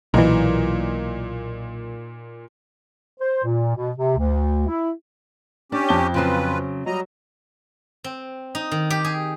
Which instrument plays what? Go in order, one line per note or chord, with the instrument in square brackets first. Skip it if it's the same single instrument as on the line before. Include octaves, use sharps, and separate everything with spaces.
[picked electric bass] B1 E3 [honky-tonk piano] A#2 D#4
[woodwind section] C5
A#2
B2
C3
D2
E4
[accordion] C#4 G4 [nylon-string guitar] D4
[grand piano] F2 A5 G7
[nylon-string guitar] C#3 F#3 C4 [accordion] F4 B4
[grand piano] F#3 [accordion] G3 D#5 A#5
[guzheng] C4
D#4
D#3
G4
G#4